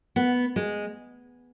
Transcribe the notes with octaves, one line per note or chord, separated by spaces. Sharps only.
B3
G#3